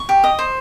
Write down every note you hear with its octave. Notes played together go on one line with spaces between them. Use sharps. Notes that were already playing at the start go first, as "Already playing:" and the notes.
Already playing: C#6
G4
D#5
C5